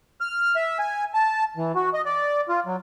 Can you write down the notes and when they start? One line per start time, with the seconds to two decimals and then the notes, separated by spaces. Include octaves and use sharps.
0.21 F6
0.56 E5
0.79 G#5
1.14 A5
1.57 E3
1.75 F#4
1.94 D#5
2.06 D5
2.49 F4
2.66 F#3